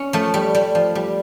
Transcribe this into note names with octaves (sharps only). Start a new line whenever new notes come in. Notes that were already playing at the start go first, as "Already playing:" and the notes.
Already playing: C#4
F3 A3
G3
G3
F3
G3